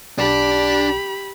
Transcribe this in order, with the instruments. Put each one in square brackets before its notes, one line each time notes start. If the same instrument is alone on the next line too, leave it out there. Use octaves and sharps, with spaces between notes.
[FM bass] B1 [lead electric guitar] D4 D5 [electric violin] G4 B5